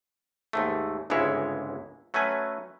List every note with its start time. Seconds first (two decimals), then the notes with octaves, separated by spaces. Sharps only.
0.53 D#2 G#2 A3
1.10 G1 C#2 G#2 G#3 E4 C#5
2.14 F#3 A3 C#4 B4 G#5